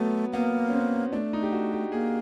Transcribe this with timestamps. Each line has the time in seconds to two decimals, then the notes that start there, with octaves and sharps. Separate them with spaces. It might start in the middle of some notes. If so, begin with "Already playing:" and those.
Already playing: F#3 A3 B3
0.33 A#3 B3
0.68 C#4
0.73 C4
1.12 A3 D4
1.33 D#4
1.43 G4
1.52 F#4
1.72 G4
1.92 A#3 G#4